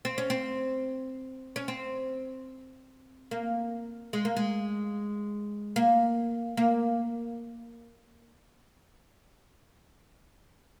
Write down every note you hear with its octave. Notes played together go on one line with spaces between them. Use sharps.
C4
C#4
C4
C#4
C4
A#3
G#3
A#3
G#3
A#3
A#3